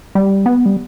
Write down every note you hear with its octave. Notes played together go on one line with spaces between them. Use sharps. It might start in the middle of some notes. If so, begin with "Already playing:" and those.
G3
B3
G3